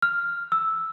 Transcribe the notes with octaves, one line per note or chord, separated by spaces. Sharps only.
F6
E6